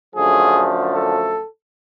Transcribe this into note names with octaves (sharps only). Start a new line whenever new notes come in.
F#2 D3 F3 A3 G#4
A4